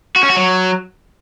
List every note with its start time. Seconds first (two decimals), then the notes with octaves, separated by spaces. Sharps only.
0.16 F#4
0.23 C#4
0.30 F#4
0.36 F#3